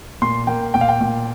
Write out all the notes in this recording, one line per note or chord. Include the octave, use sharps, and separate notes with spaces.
A#2 C6
A#3 G5
A#2 G5
F5
G5
A#2